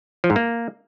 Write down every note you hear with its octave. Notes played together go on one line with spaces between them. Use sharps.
F3
G#2
A#3